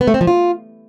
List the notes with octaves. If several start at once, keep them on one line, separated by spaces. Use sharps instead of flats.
B3
A3
C4
F3
F4